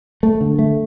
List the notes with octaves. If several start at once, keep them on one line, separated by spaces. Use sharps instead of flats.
A3
D3
A3